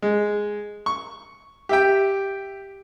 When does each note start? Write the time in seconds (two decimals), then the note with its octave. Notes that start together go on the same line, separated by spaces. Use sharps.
0.02 G#3
0.86 C#6
1.69 G4 E5 G5